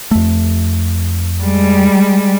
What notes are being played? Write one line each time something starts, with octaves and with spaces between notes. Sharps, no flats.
F2 A3
G3 G#3